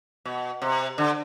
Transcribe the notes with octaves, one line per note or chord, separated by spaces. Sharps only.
B2
C3
D3